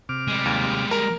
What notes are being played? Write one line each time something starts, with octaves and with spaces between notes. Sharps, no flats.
C3 D6 F6
G3 G#3
D#2
A#4 A#5